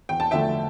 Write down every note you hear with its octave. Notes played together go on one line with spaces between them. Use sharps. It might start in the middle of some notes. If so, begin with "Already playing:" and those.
E2 G5
A5
D3 F3 A3 E5 G5